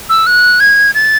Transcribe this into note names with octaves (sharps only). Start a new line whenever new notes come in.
E6
F#6
G#6
A6